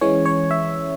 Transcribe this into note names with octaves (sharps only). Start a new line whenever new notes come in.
E3 G#3 C#4 C#5
C#5
E5